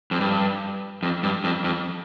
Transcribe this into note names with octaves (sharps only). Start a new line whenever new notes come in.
F2
G2
F2
G2
F2
F2